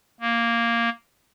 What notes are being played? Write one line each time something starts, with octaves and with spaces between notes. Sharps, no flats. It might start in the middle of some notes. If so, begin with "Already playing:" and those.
A#3